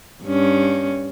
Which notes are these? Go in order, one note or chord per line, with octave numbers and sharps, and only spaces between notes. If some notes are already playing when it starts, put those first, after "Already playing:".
G2 C#4